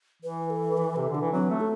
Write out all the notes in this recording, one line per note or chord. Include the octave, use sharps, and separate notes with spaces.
E3 B4
A4
B4
C3 A4
D3 D4
E3
F#3 C4
A3
A4